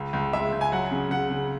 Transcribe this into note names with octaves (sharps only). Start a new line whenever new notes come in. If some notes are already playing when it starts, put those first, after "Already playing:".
Already playing: C#2
C#2
G#3 E5
C#2
G#5
F#3 F#5
C#3
C#3 F#5
C#3